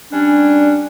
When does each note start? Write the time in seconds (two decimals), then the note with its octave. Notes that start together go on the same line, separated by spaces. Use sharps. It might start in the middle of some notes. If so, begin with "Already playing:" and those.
0.12 G3 C#4 D4